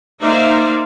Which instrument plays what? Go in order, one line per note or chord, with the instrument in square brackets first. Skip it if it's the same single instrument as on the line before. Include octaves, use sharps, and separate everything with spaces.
[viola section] A#3 D#4 C5 D5 E5 F5